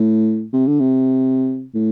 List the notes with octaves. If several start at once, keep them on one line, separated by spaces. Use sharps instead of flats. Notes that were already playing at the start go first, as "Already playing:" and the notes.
Already playing: A2
C3
D3
C3
A2